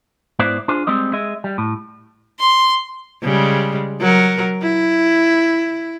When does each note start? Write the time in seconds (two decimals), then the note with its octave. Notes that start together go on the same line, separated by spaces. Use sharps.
0.39 G#2 B3 E4 C5 D5
0.68 D4 F4 G#4 C5
0.87 G3 G#3 C4 D#5
1.13 G#3 G#4 D#5 E5
1.44 G3
1.58 A2
2.39 C6
3.22 C#3 G3 G#3
4.01 F#3 A#4
4.62 E4